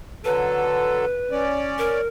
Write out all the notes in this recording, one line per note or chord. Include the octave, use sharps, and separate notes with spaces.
D3 F#3 A4 B4
C#4 D5
A#4